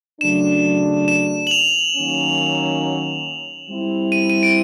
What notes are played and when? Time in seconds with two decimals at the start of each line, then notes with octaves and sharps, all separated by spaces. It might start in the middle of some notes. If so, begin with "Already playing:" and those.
0.21 C#3 F#3 A3 D4 E7
1.08 E7
1.47 F#7
1.51 F7
1.95 D#3 F#3 A#3 C#4
3.68 G3 C4 E4
4.12 D#7
4.30 D#7
4.43 D7